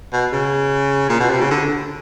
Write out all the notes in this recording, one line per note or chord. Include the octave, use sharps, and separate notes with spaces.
B2
C#3
A#2
B2
C3
C#3
D3